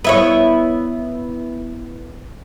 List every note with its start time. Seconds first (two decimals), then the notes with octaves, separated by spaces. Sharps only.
0.04 B3 E4 C#5